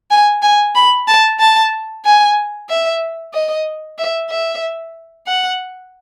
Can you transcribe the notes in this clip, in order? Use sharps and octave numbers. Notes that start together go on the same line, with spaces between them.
G#5
G#5
B5
A5
A5
G#5
E5
D#5
E5
E5
F#5